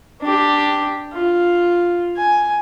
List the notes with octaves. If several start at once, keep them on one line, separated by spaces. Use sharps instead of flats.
D4 G4
F4
G#5